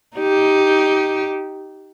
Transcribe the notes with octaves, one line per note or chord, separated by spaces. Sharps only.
D#4 G4